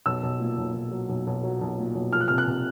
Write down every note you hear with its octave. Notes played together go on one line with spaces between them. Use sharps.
B1 E6
B1
A#2
B1
B1
F#3
B1
B1
F#3
B1
A#2
B1
F3 F6
F#6
C3 F6
F#6
C3